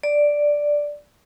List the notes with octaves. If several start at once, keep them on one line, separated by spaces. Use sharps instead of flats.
D5